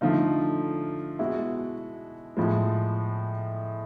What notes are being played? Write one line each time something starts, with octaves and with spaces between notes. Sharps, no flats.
D3 F3 A3 D#4 F4
B2 G#3 E4 F#4
A2 F3 G#3